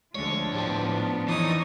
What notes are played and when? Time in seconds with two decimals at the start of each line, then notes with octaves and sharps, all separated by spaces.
0.15 D2 D3 F3 G#3 D4 C#5
0.53 A2 B3 G4
1.28 F2 E3 D#4 C#5 D5 D#6